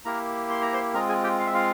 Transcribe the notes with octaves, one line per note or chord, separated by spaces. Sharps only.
A#3 E4 G4 A#4 A#5
C6
A#5
C5 C6
G#3 C4 F4 G#4 A#4 A#5
G#4 G#5
G4 G5
F5
E5
F4 F5